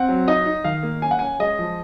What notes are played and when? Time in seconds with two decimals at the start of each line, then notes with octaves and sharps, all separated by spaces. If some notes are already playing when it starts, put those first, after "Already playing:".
Already playing: C4 F#5
0.09 F#3
0.27 D#4 D#5
0.46 D#4
0.64 D#3 F5
0.83 A#3
1.02 C#4 G#5
1.11 F#5
1.19 C#4 G#5
1.39 G#3 D#5
1.59 F3